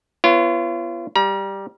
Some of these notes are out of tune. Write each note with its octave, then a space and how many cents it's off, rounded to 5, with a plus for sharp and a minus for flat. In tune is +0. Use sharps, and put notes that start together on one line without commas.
B3 +0 F4 -40 C#5 -10
G3 +5 A#5 +40